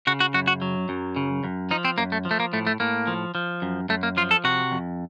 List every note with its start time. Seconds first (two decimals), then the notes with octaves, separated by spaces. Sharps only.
0.07 C#3 F#4
0.20 F#4
0.34 F#2 F#4
0.48 F#4
0.62 F#3
0.89 F#2
1.16 C#3
1.44 F#2
1.71 F3 D#4
1.85 C4
1.98 F#2 A#3
2.12 A3
2.25 F3
2.31 A3
2.40 A#3
2.53 A2 A3
2.67 A3
2.80 A2 A#3
3.07 F3
3.35 F3
3.62 F#2
3.89 F#2 A3
4.03 A#3
4.17 F3 F4
4.31 A4
4.44 C3 F#4
4.72 F2